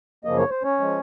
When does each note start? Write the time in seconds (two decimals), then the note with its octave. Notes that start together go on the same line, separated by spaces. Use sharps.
0.24 F#2 C#3 F3 A#3 D#5
0.37 C#5
0.50 C5
0.63 C#4 C#5
0.80 F3 G#3